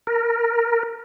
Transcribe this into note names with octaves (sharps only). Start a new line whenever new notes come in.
A#4